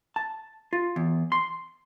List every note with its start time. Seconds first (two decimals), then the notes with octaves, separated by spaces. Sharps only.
0.16 A5
0.73 F4
0.96 E2
1.32 C6